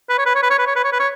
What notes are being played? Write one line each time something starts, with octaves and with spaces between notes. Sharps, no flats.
B4
C#5
B4
C#5
B4
C#5
B4
C#5
B4
C#5
B4
C#5